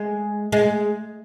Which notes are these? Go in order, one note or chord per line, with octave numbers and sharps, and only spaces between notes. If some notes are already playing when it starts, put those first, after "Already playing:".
Already playing: G#3
G#3